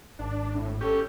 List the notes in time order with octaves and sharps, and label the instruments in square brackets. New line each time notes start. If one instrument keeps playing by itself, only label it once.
[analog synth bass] G#1 [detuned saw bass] D4
[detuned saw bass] A2
[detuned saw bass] G1 [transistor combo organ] C#4 G4 [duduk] A4